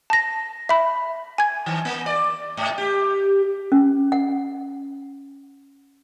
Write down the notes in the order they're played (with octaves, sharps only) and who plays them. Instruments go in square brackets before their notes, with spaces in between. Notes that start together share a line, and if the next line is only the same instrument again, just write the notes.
[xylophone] A5 A#6
E5 B5
G#5 G#6
[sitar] D#3
A#3
D5
G#2
G4
[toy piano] C#4
F#5